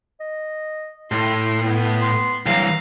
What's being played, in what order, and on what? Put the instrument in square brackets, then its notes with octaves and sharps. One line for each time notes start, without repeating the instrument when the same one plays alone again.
[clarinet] D#5
[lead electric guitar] A2 [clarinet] E4 [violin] C6
[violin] B3
[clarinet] C6
[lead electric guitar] C2 E3 [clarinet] F#3 [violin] F5 A#5